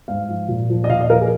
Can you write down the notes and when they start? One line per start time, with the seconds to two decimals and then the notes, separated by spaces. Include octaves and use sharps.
0.08 G#2 F5
0.28 F3
0.48 A#2
0.70 F3
0.84 D#5
0.90 A#2 F5
1.01 D#5
1.10 F3 A#4
1.21 G#4